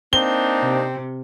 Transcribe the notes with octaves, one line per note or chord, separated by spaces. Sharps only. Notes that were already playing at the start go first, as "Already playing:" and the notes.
A#3 C4 D4 D#4 G7
C3